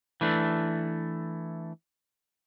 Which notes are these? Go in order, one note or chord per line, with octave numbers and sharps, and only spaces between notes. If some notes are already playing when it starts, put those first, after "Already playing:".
E3 A3 D4